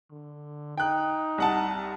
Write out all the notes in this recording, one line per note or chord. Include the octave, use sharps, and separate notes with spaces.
D3
D#4 G5 F#6
C2 F#5 A5